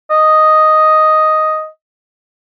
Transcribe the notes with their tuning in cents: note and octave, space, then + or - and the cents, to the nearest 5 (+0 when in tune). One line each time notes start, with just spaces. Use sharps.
D#5 +0